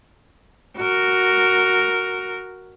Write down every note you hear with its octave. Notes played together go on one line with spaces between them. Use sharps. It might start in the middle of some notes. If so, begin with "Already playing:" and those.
F#4 A#4